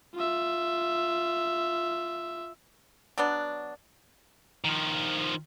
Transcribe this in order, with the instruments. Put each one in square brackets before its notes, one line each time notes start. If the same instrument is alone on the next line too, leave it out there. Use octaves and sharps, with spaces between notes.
[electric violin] F4 E5
[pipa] F#3 B3 D4
[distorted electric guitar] D#3 F3